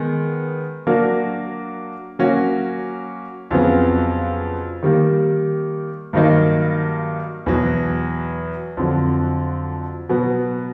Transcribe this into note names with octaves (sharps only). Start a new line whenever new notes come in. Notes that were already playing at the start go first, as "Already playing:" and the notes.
Already playing: D#3 G#3 B3
F#3 A#3 D4 F#4 A#4
F#3 A#3 C#4 F#4
F2 C#3 F#3 B3
D#3 G3 A#3
G2 D#3 F#3 A#3 D#4
E2 B2 F#3
F2 D3 F#3
B2 F#3 B3